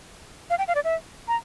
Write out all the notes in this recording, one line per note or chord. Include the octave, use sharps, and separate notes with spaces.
F5
G5
F5
D5
E5
A#5